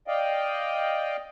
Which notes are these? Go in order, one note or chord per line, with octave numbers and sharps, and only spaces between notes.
D5 D#5 F5 G5